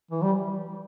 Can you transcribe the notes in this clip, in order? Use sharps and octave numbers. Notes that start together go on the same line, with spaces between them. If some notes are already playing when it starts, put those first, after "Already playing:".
E3
G3